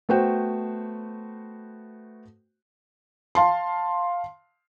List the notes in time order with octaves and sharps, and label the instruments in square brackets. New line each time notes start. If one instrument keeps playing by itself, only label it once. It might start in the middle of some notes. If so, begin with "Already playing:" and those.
[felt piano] A3 B3 F#4 C5 G5
F5 A5 C6